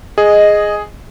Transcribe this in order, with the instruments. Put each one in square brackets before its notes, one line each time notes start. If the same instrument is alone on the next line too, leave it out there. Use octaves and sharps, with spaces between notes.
[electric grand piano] G#4 [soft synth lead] D#5